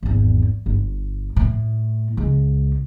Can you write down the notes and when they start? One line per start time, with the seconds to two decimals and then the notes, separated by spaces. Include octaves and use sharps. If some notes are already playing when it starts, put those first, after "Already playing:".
0.03 G#1 E2
0.66 G1
1.36 A2
2.17 C#2 G#3